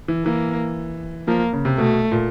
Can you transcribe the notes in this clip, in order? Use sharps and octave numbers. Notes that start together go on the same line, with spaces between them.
E3
E3 A#3
F3 A#3
C#3
C3
B2 A3
A#2